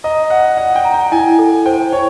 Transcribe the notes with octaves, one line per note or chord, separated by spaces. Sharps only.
D#5 A#5
D5 F#5
D5 F#5
G5
A#5
G5
E4 G#5
A4
C5 G5
E4 C#5